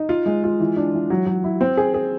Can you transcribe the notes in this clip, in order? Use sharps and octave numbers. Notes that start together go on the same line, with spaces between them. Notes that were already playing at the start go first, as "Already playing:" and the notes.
Already playing: D#4
F4
G#3
F4
E3
D4
E3
F#3
F#3
E4
C4
G#4
G#4